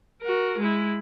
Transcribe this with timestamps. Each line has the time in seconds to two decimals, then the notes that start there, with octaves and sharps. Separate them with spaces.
0.22 F#4 A#4
0.58 G#3 E4